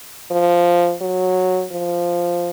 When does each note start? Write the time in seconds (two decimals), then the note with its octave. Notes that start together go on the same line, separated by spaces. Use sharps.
0.31 F3
1.01 F#3
1.72 F3